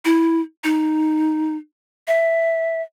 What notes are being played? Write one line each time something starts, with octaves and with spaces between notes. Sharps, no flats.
E4
D#4
E5